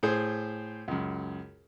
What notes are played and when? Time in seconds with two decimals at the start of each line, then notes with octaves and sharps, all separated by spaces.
0.03 A2 G#4 C5
0.88 C#2 F#2